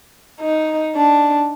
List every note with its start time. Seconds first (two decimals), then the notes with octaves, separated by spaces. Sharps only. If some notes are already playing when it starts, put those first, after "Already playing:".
0.41 D#4
0.95 D4